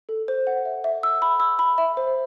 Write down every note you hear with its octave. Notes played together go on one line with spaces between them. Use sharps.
A4
C5
F#5
E5
E5
E6
B5
E6
B5
E5
C5